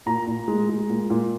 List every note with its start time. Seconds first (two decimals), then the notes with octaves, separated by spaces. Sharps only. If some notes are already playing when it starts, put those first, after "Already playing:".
0.06 A#2 A#5
0.27 A#2
0.48 G#3
0.69 G#3
0.89 A#2
1.10 A#2